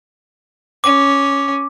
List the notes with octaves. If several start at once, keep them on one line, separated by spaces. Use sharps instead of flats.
C#4 D6